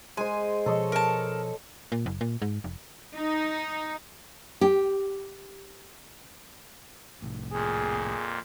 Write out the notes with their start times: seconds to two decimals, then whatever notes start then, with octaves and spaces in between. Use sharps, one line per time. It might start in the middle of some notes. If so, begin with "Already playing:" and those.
0.17 G#3 C5 G#5
0.66 B2 F3 A4 C#5 D#5
0.92 A#4 A5
1.92 A#2
2.06 F#1
2.21 A#2
2.42 G#2
2.64 F1
3.16 D#4
4.61 G4
7.22 C2 A2
7.53 F2 A#2 G#4